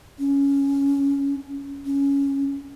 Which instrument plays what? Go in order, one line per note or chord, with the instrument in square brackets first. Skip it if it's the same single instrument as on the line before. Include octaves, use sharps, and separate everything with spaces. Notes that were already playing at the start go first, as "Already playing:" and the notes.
[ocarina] C#4
C#4